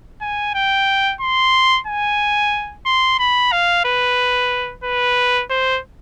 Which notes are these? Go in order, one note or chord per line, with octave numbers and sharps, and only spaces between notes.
G#5
G5
C6
G#5
C6
B5
F5
B4
B4
C5